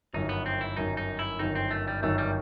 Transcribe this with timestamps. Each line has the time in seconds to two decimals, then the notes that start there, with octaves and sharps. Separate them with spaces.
0.13 G1 F#2 D#3 D#4
0.29 B3
0.46 C4
0.61 E4
0.77 G1 F#2 D#3 D#4
0.97 D#4
1.19 E4
1.39 G1 F#2 D#3 D#4
1.55 C4
1.71 A3
1.88 G3
2.03 G1 F#2 D#3 A3
2.18 G3